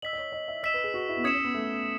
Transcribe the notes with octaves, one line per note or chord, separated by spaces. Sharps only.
D#5 E6 B6 F#7
D#5
C#5
D#5
E5
D#5 E6 B6 E7
B4
G#4
F#4
E4
B3
C#4 D#6 G#6 C#7 E7
C#4
B3
A3